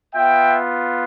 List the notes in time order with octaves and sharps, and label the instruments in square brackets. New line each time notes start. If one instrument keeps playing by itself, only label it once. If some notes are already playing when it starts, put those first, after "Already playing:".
[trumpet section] B3 F4 E5 G5